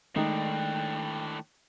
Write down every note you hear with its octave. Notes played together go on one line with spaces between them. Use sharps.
A2 D#3 G#3 A3 D4 D#4 G5